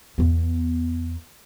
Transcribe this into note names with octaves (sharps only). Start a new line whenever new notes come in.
E2 B3